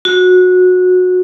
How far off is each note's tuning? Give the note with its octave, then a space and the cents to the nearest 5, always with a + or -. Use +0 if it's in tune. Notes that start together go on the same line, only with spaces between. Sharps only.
F#4 -20